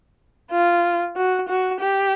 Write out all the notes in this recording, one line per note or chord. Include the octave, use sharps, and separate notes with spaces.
F4
F#4
F#4
G4